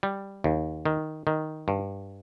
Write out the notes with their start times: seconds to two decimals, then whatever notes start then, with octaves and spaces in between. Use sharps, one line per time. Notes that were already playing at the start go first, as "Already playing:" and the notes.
0.03 G3
0.44 D#2
0.86 D#3
1.27 D#3
1.68 G2